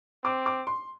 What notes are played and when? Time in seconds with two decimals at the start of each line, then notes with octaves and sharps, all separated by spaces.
0.24 C4 D6
0.46 D6
0.67 C6